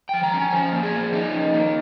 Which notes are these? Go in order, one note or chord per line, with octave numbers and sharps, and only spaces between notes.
F3 G5
A#5
C#4 G#5
F3 C5
A#3
G#4
F3
C#4 D#4
F3
A#3